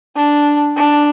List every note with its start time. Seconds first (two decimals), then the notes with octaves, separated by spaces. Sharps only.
0.15 D4
0.76 D4